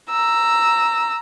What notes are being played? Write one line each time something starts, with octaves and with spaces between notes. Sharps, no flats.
A#5 E6